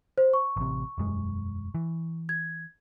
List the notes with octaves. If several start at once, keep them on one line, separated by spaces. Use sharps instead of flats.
C5
C#6
A1 C3
E1 F#2 G#3
E3
G#6